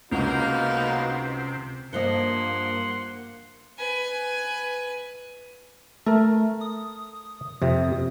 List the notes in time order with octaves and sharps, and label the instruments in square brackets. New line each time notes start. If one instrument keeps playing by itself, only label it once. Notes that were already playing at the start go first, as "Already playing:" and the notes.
[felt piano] C#2 [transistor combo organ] C3 [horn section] A#3 [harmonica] B3 D#4 F#4
[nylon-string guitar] G2 F3 D#5 [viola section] A#3 [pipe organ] F#5 C6
[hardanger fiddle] B4 G#5
[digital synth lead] A3 [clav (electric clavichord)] A4 A#4
[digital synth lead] D#6
[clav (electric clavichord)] F2 C3